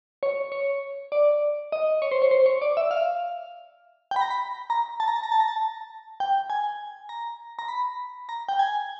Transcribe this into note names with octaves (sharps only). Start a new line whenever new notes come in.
C#5
C#5
D5
D#5
C#5
C5
C#5
C5
C#5
D5
E5
F5
G5
B5
A#5
B5
A#5
A5
A#5
A5
A#5
A5
A#5
A5
G5
G#5
A#5
A#5
B5
A#5
G5
G#5